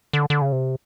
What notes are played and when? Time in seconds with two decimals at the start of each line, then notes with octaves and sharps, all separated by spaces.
0.13 D3
0.30 D3
0.41 C#3
0.52 C3